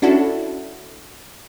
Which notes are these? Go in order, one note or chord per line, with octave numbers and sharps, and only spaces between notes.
C#4 D4 E4 F#4 A4